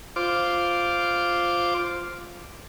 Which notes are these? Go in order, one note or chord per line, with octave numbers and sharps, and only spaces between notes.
F4 C5 D6